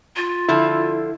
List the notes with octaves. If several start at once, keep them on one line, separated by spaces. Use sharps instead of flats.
F4
D3 F3 E4 A4